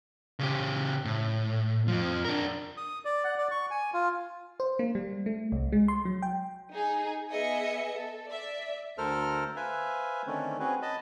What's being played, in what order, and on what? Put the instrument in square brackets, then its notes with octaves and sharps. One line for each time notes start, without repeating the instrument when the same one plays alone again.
[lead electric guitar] C#3 G4
A2
F2 F3
D4 A#4
[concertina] D#6
D5
F#5
D5
C#6
G#5
F4
[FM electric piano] C5
A#3
G3
A3
C2
G#3
C6
F#3
G5
[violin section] D#4 G#4
B3 G#4 D#5 E5 C#7
A4
D5 E5
[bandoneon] D2 A4 A#4 C5 F6
B4 C5 E5 F5 G#5
D3 D#3 A3 C4 C#4
C4 C#4 F#4 G#4 B4
D#5 A5 B5